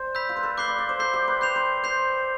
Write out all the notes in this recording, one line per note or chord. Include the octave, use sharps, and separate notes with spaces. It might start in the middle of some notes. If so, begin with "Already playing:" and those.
Already playing: C5 D5
B5 E6 G6 B6
F4
B4
A4
B4 D6 G6 C7 G7
D5
D5
C5
A4 D6 G6 C7 G7
G4
B4
C5 G6 C7 F7
B4
C5 G6 C7 F7